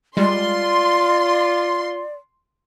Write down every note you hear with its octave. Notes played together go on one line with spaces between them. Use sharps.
G3 G#3 F4 D5 C6